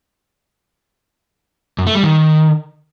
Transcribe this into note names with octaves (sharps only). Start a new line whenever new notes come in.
F#2
A3
G3
D#3